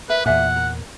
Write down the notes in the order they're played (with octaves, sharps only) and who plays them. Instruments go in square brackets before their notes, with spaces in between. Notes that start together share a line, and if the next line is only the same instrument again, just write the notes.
[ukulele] A#4 E5 [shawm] B4
[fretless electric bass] E2 A#2 [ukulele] D5 E5 G#5 [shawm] F#5
[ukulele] A#4